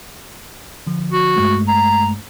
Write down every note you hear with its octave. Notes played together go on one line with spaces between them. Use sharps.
D3 F3
F#4
G2 G#3 A3
A#5